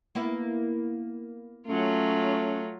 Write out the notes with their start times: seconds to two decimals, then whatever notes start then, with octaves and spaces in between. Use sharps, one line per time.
0.15 A#3 B3 E4
1.67 F#3 A3 C#4 F4